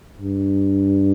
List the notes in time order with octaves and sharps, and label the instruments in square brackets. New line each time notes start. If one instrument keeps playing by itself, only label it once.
[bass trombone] G2